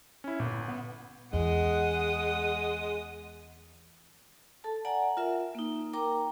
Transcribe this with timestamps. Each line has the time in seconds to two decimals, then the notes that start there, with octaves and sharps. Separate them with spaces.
0.24 C#4 E4
0.40 G1 A#2
0.68 B3
1.33 E2 G#3 F#5 D#6
4.64 A4 A5
4.85 D5 F#5 G#5 A#5
5.17 F4 A#4 E5
5.55 A#3 D#4
5.93 A#4 G5 A#5 D6